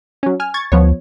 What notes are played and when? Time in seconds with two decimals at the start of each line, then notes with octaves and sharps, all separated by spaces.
0.23 F#3 C#4
0.40 G#5 F6
0.54 C#6 G#6 A6
0.72 D2 F3 B3 C#5